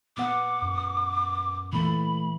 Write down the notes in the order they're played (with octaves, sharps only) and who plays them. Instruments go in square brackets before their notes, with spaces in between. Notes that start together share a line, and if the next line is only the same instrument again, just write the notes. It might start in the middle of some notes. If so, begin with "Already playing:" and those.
[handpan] A#2 B3 F#5 [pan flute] D6
[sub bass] F#2
[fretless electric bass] A#2 A3 [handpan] E3 [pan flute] B5